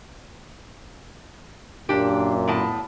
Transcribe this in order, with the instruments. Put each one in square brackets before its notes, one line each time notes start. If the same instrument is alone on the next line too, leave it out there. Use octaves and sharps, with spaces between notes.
[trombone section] F#2 A#2 [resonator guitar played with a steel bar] D4 G4
[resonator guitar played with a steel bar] A2 B3 A5